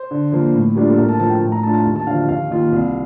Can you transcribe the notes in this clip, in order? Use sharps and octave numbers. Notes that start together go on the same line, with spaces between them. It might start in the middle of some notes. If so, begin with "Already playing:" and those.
Already playing: C5
D3
F3 A#3
A2
G3 A#3 D4 F4
A4
A2 A#4
A5
F3 A3 A5
G5
A2 A5
A#5
A3 D4 F4 A5
A5
D#2
A5
D3 F3 F5
F5
D#2 F5
D#3 A#3 F4
C2